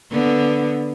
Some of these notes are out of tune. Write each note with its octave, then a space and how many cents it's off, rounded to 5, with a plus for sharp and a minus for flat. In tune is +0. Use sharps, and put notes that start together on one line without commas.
D3 +0 B3 +0